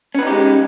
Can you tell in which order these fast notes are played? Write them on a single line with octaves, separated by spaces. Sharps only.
C#4 B4 D#4 G4 G#3